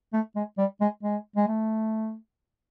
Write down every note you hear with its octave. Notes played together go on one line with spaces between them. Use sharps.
A3
G#3
G3
G#3
G#3
G#3
A3